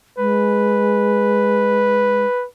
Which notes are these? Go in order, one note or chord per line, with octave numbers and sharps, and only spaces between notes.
G#3 B4